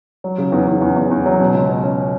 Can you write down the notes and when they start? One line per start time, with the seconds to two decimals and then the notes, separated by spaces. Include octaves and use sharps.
0.24 F#3
0.38 C#3
0.52 E2
0.67 E2
0.81 E2
0.96 E2
1.11 E2
1.26 F#3
1.40 B2
1.54 C#2
1.69 C#4
1.84 C#4